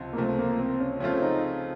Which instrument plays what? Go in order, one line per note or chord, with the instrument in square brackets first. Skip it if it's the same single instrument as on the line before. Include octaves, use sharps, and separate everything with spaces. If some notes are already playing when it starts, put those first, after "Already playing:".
Already playing: [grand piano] C#2 C3 F3
[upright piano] A#3
[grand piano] C#2 C3 F3 [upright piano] A3
[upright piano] A#3
C4
C#4
[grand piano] C#3 F3 A3 C4 F4 [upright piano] C#4
[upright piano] D#4